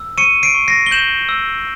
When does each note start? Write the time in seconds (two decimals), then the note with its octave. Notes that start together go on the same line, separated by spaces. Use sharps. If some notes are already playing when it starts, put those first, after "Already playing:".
Already playing: E6
0.18 C#6 C#7 D#7
0.43 C7 D7
0.55 C#6
0.68 A#6 C7
0.86 G7
0.91 G6 E7 F#7
1.29 E6